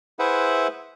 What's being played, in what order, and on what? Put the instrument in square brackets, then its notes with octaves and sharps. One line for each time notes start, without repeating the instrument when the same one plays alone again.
[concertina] E4 G#4 B4 C5 E5 F#5